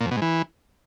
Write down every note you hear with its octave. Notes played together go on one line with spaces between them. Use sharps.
A#2
F2
B2
G#2
E3